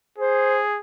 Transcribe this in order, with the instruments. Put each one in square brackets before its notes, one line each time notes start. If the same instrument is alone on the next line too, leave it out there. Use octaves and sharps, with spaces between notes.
[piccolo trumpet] G#4 [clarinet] C5